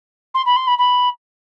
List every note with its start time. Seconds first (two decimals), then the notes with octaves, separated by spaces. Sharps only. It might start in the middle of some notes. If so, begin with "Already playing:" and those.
0.34 C6
0.45 B5
0.56 C6
0.67 B5
0.78 B5